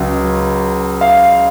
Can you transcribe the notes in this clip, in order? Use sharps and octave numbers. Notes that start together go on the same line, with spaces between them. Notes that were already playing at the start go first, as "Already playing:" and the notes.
Already playing: C#2 F#3
F5